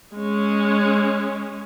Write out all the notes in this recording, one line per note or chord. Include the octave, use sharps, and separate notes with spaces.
G#3 C#4